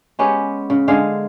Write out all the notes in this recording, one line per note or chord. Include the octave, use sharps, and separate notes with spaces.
G#3 B3 C#4 G4
C#3
D3 G#3 G#4 F5